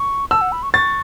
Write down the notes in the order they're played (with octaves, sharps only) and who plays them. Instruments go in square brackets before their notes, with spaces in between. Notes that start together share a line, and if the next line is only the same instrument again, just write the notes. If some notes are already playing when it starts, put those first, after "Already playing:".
Already playing: [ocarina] C#6
[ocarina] A5 [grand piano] E6
[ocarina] F#5
B5
C#6
[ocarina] C#6 [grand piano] A6